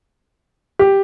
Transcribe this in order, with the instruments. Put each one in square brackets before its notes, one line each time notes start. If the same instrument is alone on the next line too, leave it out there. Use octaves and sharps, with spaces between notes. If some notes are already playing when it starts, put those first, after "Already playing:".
[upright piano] G4